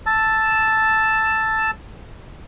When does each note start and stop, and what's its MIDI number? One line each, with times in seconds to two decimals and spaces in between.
0.06 1.71 81
0.06 1.71 88